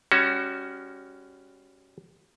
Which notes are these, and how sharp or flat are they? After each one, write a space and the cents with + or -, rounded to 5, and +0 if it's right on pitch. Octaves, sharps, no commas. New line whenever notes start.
G3 +30 C#4 +0 F#4 +15